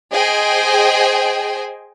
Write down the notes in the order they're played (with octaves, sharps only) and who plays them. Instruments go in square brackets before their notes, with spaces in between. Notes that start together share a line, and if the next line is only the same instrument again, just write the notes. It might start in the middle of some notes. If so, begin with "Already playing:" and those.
[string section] G#4 C5 D#5 G5 G#5